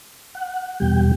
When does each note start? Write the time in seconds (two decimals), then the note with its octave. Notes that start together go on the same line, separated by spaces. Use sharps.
0.35 F#5
0.80 E2 B2 G3 G5